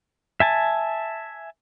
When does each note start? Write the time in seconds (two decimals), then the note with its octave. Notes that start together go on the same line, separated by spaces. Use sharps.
0.40 E5 G#5 A5